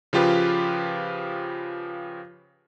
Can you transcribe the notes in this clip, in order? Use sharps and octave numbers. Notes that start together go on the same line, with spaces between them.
C#3 F3 F4 G4 B4